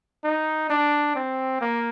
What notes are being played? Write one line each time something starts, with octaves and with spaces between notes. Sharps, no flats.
D#4
D4
C4
A#3